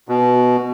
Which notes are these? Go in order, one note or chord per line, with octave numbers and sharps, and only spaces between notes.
B2